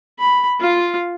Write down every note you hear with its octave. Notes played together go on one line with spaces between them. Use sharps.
B5
F4 F5